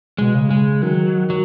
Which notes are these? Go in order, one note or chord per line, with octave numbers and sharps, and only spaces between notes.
B2 G#3
C#3
G#3
D#3 F#3
F#3